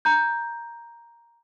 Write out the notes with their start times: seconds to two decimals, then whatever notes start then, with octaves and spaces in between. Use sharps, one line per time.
0.05 A#5 G6